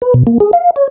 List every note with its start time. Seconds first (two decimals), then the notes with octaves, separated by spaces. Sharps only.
0.02 B4
0.14 B2
0.27 A#3
0.40 G#4
0.53 F5
0.76 C#5